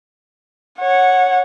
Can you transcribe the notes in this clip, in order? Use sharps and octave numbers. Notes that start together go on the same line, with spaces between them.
C#5 F#5